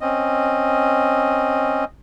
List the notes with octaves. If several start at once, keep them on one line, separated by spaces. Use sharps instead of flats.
C4 C#4 D#5